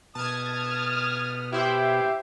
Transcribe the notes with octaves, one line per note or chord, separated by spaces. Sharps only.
B2 A5 D#6 F6 G#6
E4 G4 C5 E5